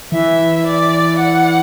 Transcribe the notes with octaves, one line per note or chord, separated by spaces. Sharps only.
E3 E5
D5
F#5